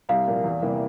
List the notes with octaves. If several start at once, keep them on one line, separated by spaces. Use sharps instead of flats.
C2 F5
A#2 F3 A#3
E2
C3 E3 G3 A#3